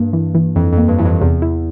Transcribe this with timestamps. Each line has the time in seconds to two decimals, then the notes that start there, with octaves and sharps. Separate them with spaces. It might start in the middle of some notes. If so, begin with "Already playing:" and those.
Already playing: G2 A#3
0.13 E3
0.35 E3
0.56 F2 E3
0.73 F2
0.78 A#3
0.88 G2
0.99 G2 E3
1.05 F2
1.21 E2 C3
1.42 E4